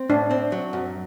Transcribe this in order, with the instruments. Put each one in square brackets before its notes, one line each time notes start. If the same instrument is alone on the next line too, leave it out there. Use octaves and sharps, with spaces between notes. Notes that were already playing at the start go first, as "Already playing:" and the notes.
Already playing: [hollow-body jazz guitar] C4
[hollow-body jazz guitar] A2 [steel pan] D4
[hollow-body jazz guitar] C4
F#3
F#2